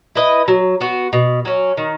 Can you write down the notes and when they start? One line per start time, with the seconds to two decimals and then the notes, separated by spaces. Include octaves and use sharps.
0.15 E4 B4 D#5
0.48 F#3
0.81 B3 F#4
1.13 B2
1.45 F#3 C#4
1.77 D#3